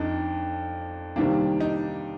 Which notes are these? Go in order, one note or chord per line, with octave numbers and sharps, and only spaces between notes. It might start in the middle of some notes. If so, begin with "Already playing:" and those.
Already playing: F2 D4 D#4
C3 D#3 G3 A#3 D4
D#4